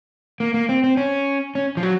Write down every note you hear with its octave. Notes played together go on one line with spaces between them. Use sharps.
A#3
A#3
C4
C4
C#4
C#4
F3
F#3